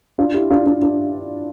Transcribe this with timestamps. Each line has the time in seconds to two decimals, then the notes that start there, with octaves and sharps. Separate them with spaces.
0.18 D4 F4
0.34 E4 G4
0.50 D4 F4
0.66 D4 F4
0.82 D4 F4